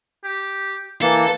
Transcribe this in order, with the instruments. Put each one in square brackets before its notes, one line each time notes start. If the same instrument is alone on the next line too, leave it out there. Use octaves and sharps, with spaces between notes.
[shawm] G4
[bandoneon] E3 A#3 [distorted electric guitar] A4 [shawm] A5